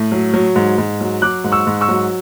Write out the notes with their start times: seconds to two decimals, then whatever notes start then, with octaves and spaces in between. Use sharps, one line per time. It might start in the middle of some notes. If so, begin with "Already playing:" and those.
Already playing: A2
0.12 F#3
0.34 F#3
0.56 G#2
0.78 G#2
1.01 F#3
1.22 F#3 D6 F#6
1.44 G#2
1.52 C#6 E6
1.67 G#2
1.81 C#6 E6
1.89 F#3